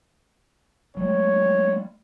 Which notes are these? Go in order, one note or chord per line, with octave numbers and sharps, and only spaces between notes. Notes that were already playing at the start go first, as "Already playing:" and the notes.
F#3 G#3 A3 C#5